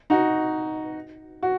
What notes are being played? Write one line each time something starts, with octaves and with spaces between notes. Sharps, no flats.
D#4 F#4
F#4